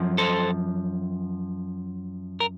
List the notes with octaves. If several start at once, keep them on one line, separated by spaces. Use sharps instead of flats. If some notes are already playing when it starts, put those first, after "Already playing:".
Already playing: F#2 F3
A4 C5
A#4